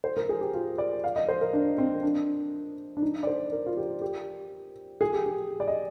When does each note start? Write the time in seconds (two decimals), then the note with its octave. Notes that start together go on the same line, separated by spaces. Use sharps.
0.04 C5
0.17 A#4
0.29 G#4
0.41 G4
0.54 F4
0.78 D5
1.04 F5
1.16 D#5
1.29 C5
1.41 A#4
1.53 D4
1.78 C4
2.03 D4
2.97 D4
3.02 D#4
3.23 D5
3.27 C5
3.52 A#4
3.66 F4
3.77 G4
4.02 G4
5.01 G#4
5.13 G4
5.26 G4
5.60 D5
5.68 D#5